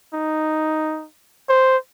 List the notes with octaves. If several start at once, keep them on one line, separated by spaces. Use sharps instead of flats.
D#4
C5